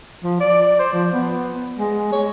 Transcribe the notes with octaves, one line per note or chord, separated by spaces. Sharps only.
F3
D5
C5
F3
B3
G#3
C#5